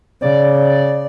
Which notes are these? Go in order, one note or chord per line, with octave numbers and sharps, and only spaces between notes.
C#3 D5